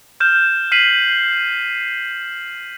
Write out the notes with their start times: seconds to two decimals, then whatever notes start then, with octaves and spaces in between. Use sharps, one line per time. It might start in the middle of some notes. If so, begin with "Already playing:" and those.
0.20 F6 G6 E7
0.72 F6 B6 C7 D#7 F#7